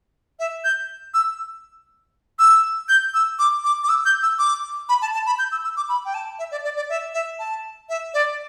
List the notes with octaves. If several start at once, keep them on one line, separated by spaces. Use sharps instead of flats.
E5
G6
E6
E6
G6
E6
D6
D6
D6
E6
G6
E6
D6
B5
A5
A5
B5
G6
E6
E6
D6
B5
G5
A5
E5
D5
D5
D5
E5
E5
A5
E5
D5